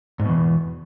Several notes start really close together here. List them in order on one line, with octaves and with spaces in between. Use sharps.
G#2 B2 E2